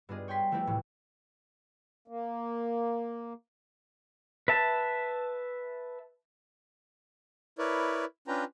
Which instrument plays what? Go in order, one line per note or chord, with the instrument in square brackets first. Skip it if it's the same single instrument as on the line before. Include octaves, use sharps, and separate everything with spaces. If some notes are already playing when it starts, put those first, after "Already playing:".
[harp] G2 B3 D4 F4 G#4 D#5
C#5 G5 G#5 C6 B6
F3 A3 B3 C4 E4 G4
C2 A2 E3
[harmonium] A#3
[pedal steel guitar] B4 E5 A5
[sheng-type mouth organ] E4 A#4 B4 C#5 D5
C#4 D4 F4 B4 G5 A#5